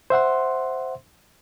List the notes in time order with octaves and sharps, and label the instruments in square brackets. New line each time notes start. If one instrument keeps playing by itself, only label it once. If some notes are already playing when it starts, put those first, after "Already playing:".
[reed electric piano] C5 E5 F#5 C6